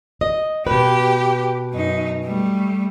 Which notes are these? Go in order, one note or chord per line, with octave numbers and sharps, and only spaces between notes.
D#5
B2 G4 B4
F#2 D#4
G3 A3